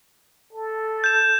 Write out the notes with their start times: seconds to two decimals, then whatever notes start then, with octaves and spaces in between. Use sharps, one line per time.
0.53 A4
1.04 G6 E7